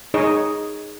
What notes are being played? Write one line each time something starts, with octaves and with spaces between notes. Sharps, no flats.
D#4 G#4 C#5 D#5